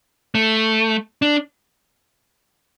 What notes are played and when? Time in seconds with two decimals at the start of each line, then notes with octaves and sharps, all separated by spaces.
0.35 A3
1.22 D4